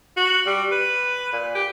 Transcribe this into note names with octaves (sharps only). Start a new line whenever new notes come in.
F#4
G3
B4
A#2
G4